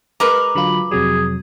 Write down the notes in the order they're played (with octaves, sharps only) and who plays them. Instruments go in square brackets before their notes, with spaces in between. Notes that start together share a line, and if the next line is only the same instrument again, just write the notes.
[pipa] G#3 A#4 B4 [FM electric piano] A#5 F6 [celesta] D6
[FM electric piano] D3 F#3 F4 [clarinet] B5
[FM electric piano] F2 C3 F#3 [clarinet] G#4